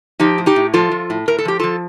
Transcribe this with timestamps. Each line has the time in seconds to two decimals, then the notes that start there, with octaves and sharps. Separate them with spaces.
0.20 F3 D#4 G4
0.38 A2
0.46 D#4 G4
0.56 A2
0.74 F3 F4 A4
0.91 F3
1.10 A2
1.28 A2 A#4
1.38 A4
1.45 F3 G4
1.59 F3 F4 A4